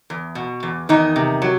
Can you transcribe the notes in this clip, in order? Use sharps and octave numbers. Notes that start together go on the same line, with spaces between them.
E2
B2
E2
E2 D#3 D#4
C3
F#3